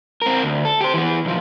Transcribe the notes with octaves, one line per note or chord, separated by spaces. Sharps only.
C4 A#4
D2
A4
G4 C5
E3 B3
B1 F3